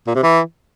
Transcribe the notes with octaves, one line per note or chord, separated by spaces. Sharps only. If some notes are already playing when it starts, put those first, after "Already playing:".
A#2
C3
E3